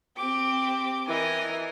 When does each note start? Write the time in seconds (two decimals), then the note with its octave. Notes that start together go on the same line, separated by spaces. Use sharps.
0.17 C4 G4 D6
1.08 E3 A#4 D#5 G#5